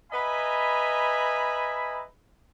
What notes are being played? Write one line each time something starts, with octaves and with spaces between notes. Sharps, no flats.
B4 D#5 E5 G#5 A#5 B5